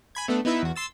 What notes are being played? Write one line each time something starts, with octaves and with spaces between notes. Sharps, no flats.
G#5 B5 G#6
A3 B3 D4 A4
B3 D#4 E4 B4 E5
E2 F#4
C6 E6 A6